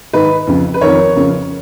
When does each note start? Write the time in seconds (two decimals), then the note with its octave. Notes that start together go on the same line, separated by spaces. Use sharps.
0.13 G#2 D#3 B4 D#5
0.47 F2 C#3
0.74 B4
0.81 F2 D#3 A#4 C#5
1.15 F2 C#3